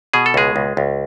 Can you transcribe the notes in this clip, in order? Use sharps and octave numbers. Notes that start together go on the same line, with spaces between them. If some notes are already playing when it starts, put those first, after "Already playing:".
B2 G#4
A4
C#2 G#3 G#4
C#2
C#2